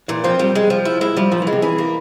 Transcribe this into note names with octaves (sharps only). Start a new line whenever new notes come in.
A#2 E3
F3 C4
F3 G3
G#3
F3
E4
G#3 E4
F3 G3
A#2 F3
E3
G#3
C3
E3 G#4
A#3